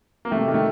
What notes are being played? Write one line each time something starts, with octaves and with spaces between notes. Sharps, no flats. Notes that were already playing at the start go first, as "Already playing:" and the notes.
A#3
C3 A3
D#3
A3